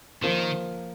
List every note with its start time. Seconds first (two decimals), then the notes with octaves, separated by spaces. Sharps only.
0.23 D#3 F3 A#3